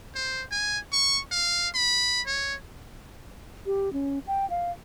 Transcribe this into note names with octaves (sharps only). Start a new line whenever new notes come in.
C5
G#5
C#6
F5
B5
C#5
G4
C#4
G5
F5